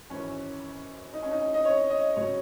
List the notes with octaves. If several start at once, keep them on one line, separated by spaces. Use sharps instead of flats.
G#1 F#2 E3 C#4
D#4
C#4
D#4
D#5
C#5
D#5
C#3 F#3 C#5